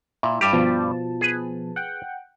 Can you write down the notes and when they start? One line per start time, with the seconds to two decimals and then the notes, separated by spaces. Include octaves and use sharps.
0.23 A#2 E4
0.41 G2 G3 G4
0.53 B2 F3 A5
1.21 G#4 B4
1.76 F#5 G5